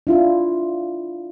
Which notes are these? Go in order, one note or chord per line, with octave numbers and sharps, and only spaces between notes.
D4 E4 F4